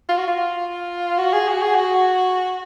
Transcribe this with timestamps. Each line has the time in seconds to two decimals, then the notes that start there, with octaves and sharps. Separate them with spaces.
0.09 F4
0.18 F#4
0.28 F4
1.18 F#4
1.33 G#4
1.48 F#4
1.62 G#4
1.75 F#4